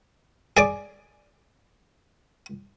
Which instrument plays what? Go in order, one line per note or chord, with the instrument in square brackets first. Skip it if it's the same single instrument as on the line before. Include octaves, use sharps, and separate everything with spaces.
[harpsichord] G#4 D5 D6